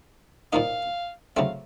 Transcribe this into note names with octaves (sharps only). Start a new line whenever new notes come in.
A#2 F3 A#3 D#4 F5
C#3 F#3 A3 C4 F5